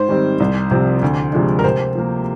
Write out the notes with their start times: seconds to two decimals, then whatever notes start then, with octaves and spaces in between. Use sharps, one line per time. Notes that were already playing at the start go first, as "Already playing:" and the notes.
Already playing: G#2 C5
0.09 D#3 G3 C4
0.40 C2
0.71 C3 F3 C4
1.03 D2
1.33 C3 F3 G#3 D4
1.59 A#4
1.64 C3 C5
1.95 F3 A#3